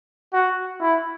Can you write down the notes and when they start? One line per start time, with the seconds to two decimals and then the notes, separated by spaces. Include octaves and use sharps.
0.33 F#4
0.80 E4